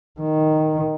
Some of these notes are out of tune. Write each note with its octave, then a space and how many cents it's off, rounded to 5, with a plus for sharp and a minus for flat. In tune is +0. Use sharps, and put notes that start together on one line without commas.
D#3 +0